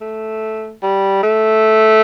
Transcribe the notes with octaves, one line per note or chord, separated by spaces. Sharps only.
A3
G3
A3